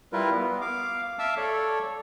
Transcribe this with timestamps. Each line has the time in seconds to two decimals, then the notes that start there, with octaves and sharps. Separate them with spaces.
0.13 G3 E4 F4 A#4 B4
0.31 B3
0.61 F5 D6
1.19 E5 F5 A5 D6 E6
1.37 A4 C#5 D5